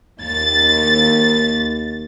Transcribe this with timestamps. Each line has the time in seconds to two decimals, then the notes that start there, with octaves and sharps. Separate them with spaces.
0.21 D#2 A6